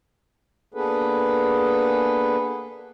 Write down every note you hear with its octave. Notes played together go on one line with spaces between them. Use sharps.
A#3 B3 D4 G#4 A4 B4